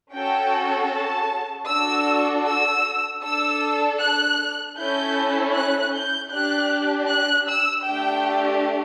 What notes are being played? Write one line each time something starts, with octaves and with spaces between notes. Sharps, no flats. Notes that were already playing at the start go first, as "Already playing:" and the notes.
C#4 F#4 A4 G5
A5
D4 F#4 A4 E6
E6
D4 A4 E6
F#6
C#4 E4 A4 G6
F#6
G6
D4 G4 F#6
F#6
E6
A3 D4 G4 G5